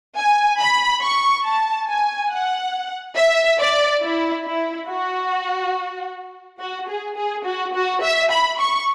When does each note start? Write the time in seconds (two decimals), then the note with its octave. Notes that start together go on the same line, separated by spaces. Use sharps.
0.17 G#5
0.60 B5
1.03 C#6
1.46 A5
1.88 G#5
2.31 F#5
3.17 E5
3.60 D5
4.03 E4
4.46 E4
4.88 F#4
6.59 F#4
6.88 G#4
7.16 G#4
7.45 F#4
7.74 F#4
8.02 E5
8.31 B5
8.59 C#6